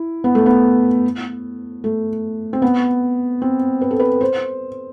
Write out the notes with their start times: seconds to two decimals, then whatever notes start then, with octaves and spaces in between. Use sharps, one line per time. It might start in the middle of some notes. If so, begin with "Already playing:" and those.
Already playing: E4
0.24 B3
0.35 A3
0.46 B3
1.84 A3
2.53 C4
2.62 B3
3.42 C4
3.81 B4
3.91 A4
4.00 B4
4.21 C5